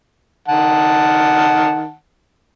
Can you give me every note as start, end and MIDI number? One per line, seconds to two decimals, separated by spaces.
0.48 1.93 51
0.48 1.93 78
0.48 1.93 81